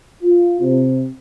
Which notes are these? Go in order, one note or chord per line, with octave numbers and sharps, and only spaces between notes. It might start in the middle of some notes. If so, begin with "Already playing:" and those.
F4
C3